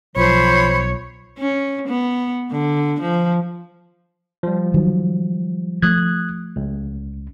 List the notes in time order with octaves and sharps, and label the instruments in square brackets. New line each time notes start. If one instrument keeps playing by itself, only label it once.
[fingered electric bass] B1 [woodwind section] F3 F#3 F4 [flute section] C5 B5 [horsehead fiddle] C#5
[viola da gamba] C#4
B3
D3
F3
[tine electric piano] F3 G3
[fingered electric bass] D#3 F#3
[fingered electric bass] F3 A3 [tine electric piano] D#6 F#6 G#6
[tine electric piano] C#2